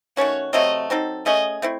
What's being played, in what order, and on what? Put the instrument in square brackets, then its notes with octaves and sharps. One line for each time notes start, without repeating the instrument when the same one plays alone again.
[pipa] D#3 A3 C#4 F#4 [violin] C#5
[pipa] C3 F#3 A3 C4 [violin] D#5
[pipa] F#3 C4 D#4 A4
[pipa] A3 C#4 G#4 [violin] D#5
[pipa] A3 C4 E4